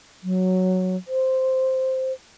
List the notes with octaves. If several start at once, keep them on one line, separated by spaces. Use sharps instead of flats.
F#3
C5